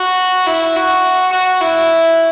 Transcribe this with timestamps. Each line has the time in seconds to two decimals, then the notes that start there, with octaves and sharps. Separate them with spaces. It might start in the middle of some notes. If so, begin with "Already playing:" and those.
Already playing: F#4
0.47 E4
0.76 F#4
1.32 F#4
1.61 E4